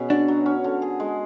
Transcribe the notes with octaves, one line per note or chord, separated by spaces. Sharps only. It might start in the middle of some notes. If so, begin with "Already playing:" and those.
Already playing: B2 B3 C#4 G#4
D4 F#4
F#3
C#4
D3
G#4
G#3